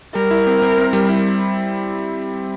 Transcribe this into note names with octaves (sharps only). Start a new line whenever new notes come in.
G3 A#4
E4
C4
C4
C4
G3
E4